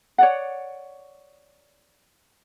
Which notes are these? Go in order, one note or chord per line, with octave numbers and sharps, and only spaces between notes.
C#5 D5 F#5